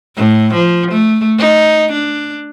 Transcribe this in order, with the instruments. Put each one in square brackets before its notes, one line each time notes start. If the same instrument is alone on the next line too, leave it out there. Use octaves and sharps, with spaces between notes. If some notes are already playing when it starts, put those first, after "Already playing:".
[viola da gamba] A2
F3
A3
D#4
D4